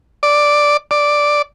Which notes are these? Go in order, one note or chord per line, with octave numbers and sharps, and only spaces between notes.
D5
D5